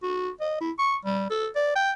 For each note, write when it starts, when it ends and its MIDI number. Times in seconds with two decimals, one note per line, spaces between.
0.03 0.31 66
0.41 0.59 75
0.61 0.72 64
0.79 0.97 85
1.05 1.30 55
1.30 1.48 69
1.56 1.76 74
1.76 1.92 79